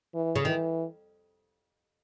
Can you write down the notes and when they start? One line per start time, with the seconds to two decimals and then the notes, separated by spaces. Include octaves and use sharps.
0.15 E3
0.36 C#3
0.45 D#3 E3